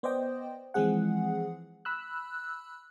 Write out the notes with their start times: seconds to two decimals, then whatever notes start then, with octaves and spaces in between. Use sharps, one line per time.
0.03 B3 C5 D5 D#5 G5
0.74 E3 F3 G#3 C4 G#4 F#5
1.85 B5 E6 F#6